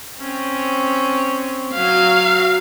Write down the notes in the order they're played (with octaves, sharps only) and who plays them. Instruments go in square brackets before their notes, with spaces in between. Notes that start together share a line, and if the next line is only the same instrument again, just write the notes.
[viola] C4 C#4
[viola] F#3 [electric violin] F5